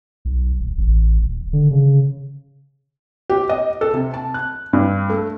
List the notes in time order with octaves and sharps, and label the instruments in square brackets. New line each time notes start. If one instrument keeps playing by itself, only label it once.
[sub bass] B1
D#1
A1
D#1
D3
C#3
[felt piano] G4
D#5
A4
C3
A5
F#6
G2
A3